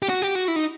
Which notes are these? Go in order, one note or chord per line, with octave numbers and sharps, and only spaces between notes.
G4
F#4
G4
F#4
E4
D#4